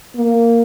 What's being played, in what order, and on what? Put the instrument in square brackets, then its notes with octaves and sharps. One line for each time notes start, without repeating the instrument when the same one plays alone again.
[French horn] A#3